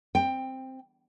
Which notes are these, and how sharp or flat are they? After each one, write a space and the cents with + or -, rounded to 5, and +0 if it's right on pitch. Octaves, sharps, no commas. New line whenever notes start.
C4 +0 G5 +15